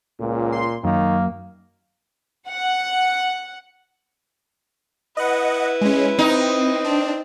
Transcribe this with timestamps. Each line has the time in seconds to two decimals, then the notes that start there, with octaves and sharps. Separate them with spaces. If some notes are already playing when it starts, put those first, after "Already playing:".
0.20 C#2 A#2
0.52 C6
0.84 F#2 D#3 A#3
2.48 F#5
5.17 E4 B4 D#5 F#5
5.81 G#3 C#4
6.19 C4 D#4
6.84 C4 D4